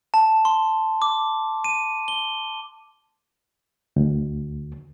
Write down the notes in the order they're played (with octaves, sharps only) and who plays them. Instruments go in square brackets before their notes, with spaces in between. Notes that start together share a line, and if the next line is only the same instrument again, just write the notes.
[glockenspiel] A5
C6
D6
D#7
G7
[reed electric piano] D2